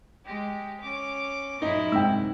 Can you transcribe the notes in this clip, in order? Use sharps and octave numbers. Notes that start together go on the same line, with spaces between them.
G#3 G4
C#4 D6
F#2 A#2 D#4 E4
G#2 C3 G5 E6